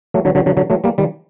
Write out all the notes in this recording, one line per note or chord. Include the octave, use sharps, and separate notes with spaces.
F#3 A3
D3 F#3
D3 F#3
D3 F#3
D3 F#3
F#3 A3
G3 A#3
D#3 G3